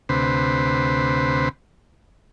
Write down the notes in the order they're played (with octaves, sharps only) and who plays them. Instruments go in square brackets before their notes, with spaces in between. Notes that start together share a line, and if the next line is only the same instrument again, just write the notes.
[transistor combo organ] D2 C3 B4 C5